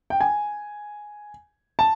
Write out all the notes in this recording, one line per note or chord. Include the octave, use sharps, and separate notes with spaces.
G5
G#5
A5